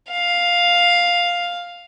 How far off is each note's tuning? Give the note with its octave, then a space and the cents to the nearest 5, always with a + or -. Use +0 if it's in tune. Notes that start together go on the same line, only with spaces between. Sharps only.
F5 +5